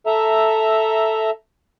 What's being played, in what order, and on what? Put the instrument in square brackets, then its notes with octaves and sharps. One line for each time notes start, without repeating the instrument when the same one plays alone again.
[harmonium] A4 E5 A#5